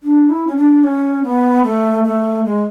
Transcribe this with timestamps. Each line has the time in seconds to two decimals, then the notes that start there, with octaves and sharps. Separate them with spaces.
0.03 D4
0.30 E4
0.47 C#4
0.57 D4
0.84 C#4
1.24 B3
1.64 A3
2.04 A3
2.44 G#3